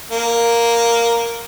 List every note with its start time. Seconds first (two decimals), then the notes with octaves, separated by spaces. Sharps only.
0.11 A#3